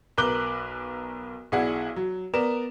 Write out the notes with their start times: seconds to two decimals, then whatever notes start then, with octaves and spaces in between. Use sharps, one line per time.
0.18 B1 A#4 B4 D6 F#6 G7
1.52 B1 E4 G#4 D5 F#5
1.96 F#3
2.34 B3 A#4 D5 E7